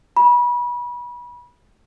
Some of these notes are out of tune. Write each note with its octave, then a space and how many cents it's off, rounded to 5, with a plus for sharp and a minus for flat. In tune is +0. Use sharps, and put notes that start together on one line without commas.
B5 -30